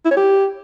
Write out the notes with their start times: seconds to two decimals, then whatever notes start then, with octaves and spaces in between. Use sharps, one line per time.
0.05 E4
0.11 C#5
0.17 G4